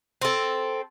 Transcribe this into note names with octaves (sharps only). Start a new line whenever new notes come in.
C4 A4